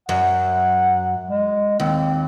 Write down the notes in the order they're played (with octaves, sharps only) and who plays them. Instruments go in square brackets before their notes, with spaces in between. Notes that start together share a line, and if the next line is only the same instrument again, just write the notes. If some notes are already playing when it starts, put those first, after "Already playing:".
[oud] F#2 [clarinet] F#5
[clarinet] G#3
[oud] D#2 [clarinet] C4